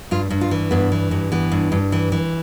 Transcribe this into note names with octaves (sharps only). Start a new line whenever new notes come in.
G2 F4
G2
F4
E3
G2 B3
E3
G2
E3 B3
G2
G2
E3
E3